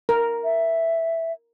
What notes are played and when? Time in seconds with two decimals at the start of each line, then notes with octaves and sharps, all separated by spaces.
0.09 A#4
0.44 E5